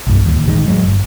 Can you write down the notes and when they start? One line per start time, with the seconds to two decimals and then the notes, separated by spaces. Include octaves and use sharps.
0.07 B1 G2
0.26 D1 D#2
0.47 A1 A2 D#3 G#3
0.67 A2 F#3 G#3
0.84 G1